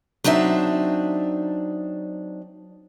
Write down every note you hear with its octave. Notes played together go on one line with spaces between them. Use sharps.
F#3 C4 D4 D#4 E5